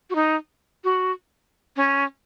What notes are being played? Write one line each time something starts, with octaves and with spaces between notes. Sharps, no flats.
F#4
D#4
F#4
C#4